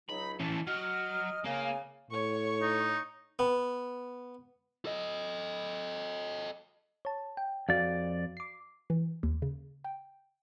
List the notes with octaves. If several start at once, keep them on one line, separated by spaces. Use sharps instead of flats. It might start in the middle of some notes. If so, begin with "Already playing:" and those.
C#2 F#3 D#4 B5
E3 C#4 A5
F#3 D#5 F6
C#3 A#3 G#5
A2 C#5 C#6
D#4
B3
A4 D#5
C#5 A5
G5
F2 F#4 D5 F5
D6 C7
E3
D#2
C#3
G5